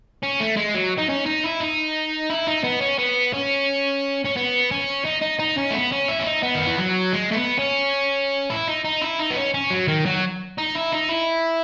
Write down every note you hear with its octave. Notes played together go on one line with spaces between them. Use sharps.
C#4
A3
G#3
F#3
D#4
C#4
D#4
E4
D#4
E4
D#4
B3
C#4
B3
C#4
C#4
B3
C#4
D#4
D#4
D#4
C#4
A3
B3
C#4
E4
C#4
D#4
B3
D#3
E3
F#3
G#3
A3
B3
C#4
E4
D#4
D#4
E4
D#4
B3
C#4
C#4
F#3
D#3
F#3
D#4
E4
D#4
E4